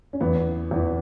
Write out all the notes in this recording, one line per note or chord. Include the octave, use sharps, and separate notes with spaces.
C#4
E2 E3 B3
E2 E3